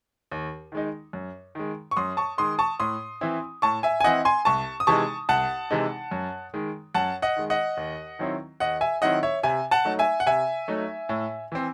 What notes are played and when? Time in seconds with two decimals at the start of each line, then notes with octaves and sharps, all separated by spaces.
0.32 D#2
0.72 D#3 G#3 D#4
1.13 F#2
1.55 D#3 G#3
1.91 C#6
1.96 F#2 C6 D#6
2.17 A5 C#6
2.38 D#3 G#3 C6 D#6
2.59 A5 C#6
2.80 A2 C6 D#6
3.21 E3 C4 E4
3.62 A2 A5 C#6
3.83 E5 G#5
4.00 G#5
4.04 E3 C4 E4 D#5 F#5
4.25 G#5 C6
4.45 C2 A5 C#6
4.80 D#6
4.87 C3 E3 G#3 D#4 A5 C#6
5.29 C2 F#5 A5
5.70 C3 E3 G#3 D#4
6.11 F#2
6.54 D#3 G#3
6.94 F#2 F#5 A5
7.22 D#5 F#5
7.36 D#3 G#3
7.50 D#5 F#5
7.77 D#2
8.19 D#3 F#3 C4 E4
8.60 D#2 D#5 F#5
8.81 E5 G#5
9.02 D#3 F#3 C4 E4 D#5 F#5
9.23 C#5 E5
9.43 C3 E5 G#5
9.71 F#5 A5
9.85 F#3 A3 D#4
9.99 E5 G#5
10.20 F#5
10.27 C3 E5 G#5
10.68 F#3 A3 D#4
11.09 A2
11.52 E3 C4